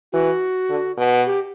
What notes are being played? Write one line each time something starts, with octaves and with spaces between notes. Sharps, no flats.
E3 F#4
D3
B2
G4